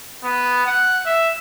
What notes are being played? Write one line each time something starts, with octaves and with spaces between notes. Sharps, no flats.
B3
F#5
E5